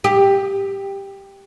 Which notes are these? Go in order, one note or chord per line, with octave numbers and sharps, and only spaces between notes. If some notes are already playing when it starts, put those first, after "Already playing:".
G4